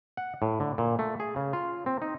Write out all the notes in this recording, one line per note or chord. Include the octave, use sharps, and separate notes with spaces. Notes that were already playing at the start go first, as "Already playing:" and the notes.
F#5
A2
D3
A#2
A3
G#4
C#3
F4
C4
D#4